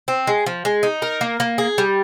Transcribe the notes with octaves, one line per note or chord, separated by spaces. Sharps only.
C4
G#3
F3
G#3
D#4
A#4
A#3
A#3
G#4
G3